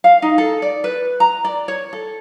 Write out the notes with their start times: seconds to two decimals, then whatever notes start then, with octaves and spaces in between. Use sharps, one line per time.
0.04 F5
0.22 D#4
0.38 A4
0.62 D5
0.84 B4
1.20 A#5
1.45 D5
1.68 C#5
1.93 A4